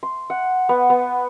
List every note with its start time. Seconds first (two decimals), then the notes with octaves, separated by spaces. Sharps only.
0.03 C6
0.30 F#5
0.69 B3
0.90 B3